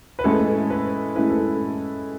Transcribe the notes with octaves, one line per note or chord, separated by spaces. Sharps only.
B4
A2 G#3 C#4 E4 A4
B4
A2 G#3 C#4 E4 B4
A4